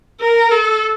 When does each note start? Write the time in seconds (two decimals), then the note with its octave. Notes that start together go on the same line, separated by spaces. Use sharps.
0.20 A#4
0.51 A4